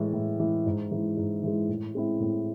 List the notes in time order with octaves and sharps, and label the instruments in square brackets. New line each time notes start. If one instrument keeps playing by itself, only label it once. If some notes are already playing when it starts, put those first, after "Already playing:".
Already playing: [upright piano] A2 E3 G#3
A2
E3 G#3
G#2
E3 G#3
G#2
E3 G#3
A2
G#3 C4 E4
A2